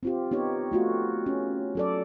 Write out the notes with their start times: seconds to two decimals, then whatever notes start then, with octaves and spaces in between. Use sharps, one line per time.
0.03 C4 F4 G4
0.31 B3 D#4 G4 C#5
0.72 A3 F4 F#4
1.26 C#4
1.75 F#3 A4 D5